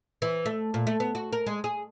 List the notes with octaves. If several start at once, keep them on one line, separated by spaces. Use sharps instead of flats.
E3
A3
A#2
A3
B3
F#4
A#4
G#3
G#4